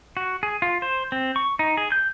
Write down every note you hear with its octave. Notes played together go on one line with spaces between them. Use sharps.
F#4
G#4
F4
C5
C4
C#6
D#4
G#4
G6